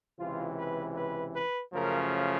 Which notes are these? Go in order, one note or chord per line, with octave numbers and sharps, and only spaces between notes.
C#2 C3 E3 F4
B4
B4
B4
F#2 C#3 F3 A3 A#4